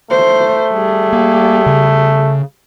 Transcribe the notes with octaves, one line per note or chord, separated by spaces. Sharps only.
A3 C5
G3 G#4
A#3
C#3